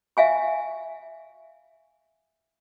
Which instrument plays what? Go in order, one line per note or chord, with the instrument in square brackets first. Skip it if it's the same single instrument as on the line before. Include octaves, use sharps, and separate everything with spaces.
[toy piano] E5 F5 G#5 C#6